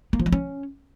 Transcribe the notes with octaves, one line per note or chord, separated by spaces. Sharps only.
A#3
F3
A#3
C#4